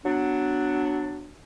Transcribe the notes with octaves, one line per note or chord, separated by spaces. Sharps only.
F#3 B3 D4